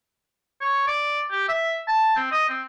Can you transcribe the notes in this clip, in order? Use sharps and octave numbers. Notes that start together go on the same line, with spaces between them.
C#5
D5
G4
E5
A5
C4
D#5
C4